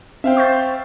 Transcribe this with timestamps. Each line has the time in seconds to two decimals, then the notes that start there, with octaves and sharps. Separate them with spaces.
0.24 C4 C5 E5 F5 G5
0.37 C#6 G6 A6